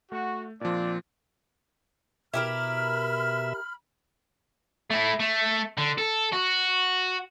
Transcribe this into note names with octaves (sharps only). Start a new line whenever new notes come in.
A3 F#4
A#2 F3 C4 D4 D5
B2 E4 G4 A#4 E5 B5 F6
A3 E4
A3
D3
A4
F#4